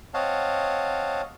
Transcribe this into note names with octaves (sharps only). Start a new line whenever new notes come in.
C4 C#5 D#5 F5 F#5 A5